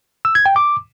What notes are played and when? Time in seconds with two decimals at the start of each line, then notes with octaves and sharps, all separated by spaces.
0.25 E6
0.35 G#6
0.46 G5
0.56 D6